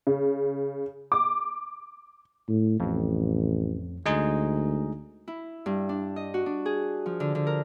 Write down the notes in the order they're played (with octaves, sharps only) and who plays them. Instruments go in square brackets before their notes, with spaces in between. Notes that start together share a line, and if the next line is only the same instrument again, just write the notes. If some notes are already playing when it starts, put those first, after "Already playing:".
[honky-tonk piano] C#3
D6
[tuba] A2
[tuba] A1 [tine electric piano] F2
[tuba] D2 [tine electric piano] G#3 D#4 G#4
[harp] E4
G2
D4
D#5
F#4
D4
G#4
F3
D3
D3
A#4